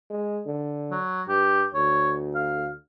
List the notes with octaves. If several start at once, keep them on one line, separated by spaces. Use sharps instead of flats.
G#3
D3
F#3
G2 G4
D2 C#5
F5